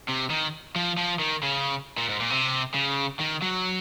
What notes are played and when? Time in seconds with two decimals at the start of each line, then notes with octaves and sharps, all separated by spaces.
0.09 C3
0.30 D#3
0.76 F3
0.97 F3
1.19 D#3
1.43 C#3
1.97 A#2
2.09 G#2
2.20 A#2
2.30 C3
2.74 C#3
3.19 D#3
3.42 F#3